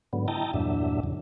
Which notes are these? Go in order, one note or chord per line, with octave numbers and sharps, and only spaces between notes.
G#2 D3 F#3 B3
E4 D#5 G5 A5 A#5
E2 G2 A#2 F#3 D4 E5
E2 C#3